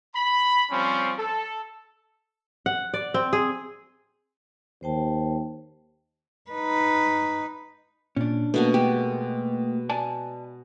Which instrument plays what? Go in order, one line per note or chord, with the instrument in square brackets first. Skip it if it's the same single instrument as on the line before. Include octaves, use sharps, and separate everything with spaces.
[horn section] B5
F3 G3 C4 C#4
A4
[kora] F#5
D5
C4
G#4
[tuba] D#2 [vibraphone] C5 G5 A5
[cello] D#4 B4
[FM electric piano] A#2 [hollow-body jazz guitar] C#4 D4
[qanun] B2 F#4 G#5 [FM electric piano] A3 A#3
[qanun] G#3 [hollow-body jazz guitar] G4
[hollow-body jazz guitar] D5 G#5 A5